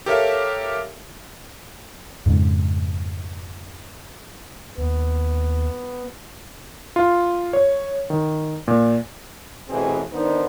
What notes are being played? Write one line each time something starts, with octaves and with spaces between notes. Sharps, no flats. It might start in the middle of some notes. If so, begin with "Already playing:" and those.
G4 A4 A#4 C#5 E5 F5
F2 G#2 C#3
D#2 B3
F4
C#5
D#3
A#2
A1 B2 E3 C4 G#4
D#3 B3 D4 D#4 C5